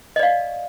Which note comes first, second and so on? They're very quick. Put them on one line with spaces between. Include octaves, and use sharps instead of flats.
D#5 D5 F5